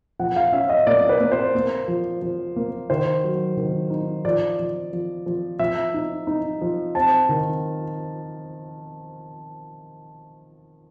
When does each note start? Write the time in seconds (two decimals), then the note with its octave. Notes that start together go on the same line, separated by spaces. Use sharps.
0.20 F3 F#5
0.36 F5
0.52 C#4 E5
0.70 D#5
0.87 A#3 D5
1.09 B4
1.20 A#3
1.32 C5
1.55 A#3
1.88 F3
2.22 F3
2.56 A#3
2.90 D#3 C5
3.24 F#3
3.57 D#3
3.90 D#4
4.25 F3 D5
4.59 F3
4.93 F3
5.26 F3
5.59 F3 E5
5.94 D#4
6.27 D#4
6.62 F3
6.95 C4 A5
7.29 D#3